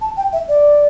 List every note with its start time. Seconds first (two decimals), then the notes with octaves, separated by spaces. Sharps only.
0.01 A5
0.17 G5
0.33 E5
0.49 D5